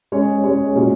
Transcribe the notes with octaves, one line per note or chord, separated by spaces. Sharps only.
G#3 C#4 G#4 C#5
G#3 C#4 G#4 C#5
A#2 G#3 C#4 F#4 C#5